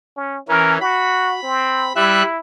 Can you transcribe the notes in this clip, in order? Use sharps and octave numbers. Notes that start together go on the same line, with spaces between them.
C#4
E3 C#4 A#4
F#4 B5
C4
G3 E4 E5 F#6